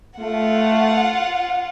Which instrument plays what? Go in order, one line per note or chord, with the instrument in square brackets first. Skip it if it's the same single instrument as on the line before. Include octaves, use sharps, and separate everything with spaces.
[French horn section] A3 [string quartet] F4 F#5